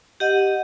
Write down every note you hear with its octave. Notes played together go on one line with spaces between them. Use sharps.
G4 D#5 F#5